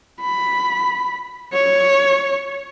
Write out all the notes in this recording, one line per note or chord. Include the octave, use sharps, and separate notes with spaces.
B5
C#5